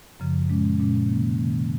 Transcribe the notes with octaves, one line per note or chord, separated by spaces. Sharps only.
F#2 C#3 F3
A#2 G#3 C#4
A#2 G#3 C#4
C3 D#3 A#3
C3 D#3 A#3